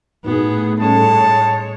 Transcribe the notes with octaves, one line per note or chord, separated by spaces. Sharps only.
A2 B3 D#4 F#4 G#4
G3 G#3 C#4 A4 C#5 A5